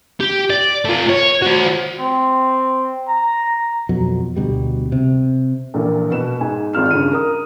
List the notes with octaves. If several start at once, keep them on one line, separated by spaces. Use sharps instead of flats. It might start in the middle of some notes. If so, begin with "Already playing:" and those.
G4
D5
A3 F4
C#5
F#4 C5
C4
A#5
F2 B2 F#3
D2 B2 G3
C3
A#1 A#2 E3 A#3
B2 B4 E7
G#2 G#5
G#1 G#2 F4 F6 E7
G2 C#3 D#7
A#4 D#6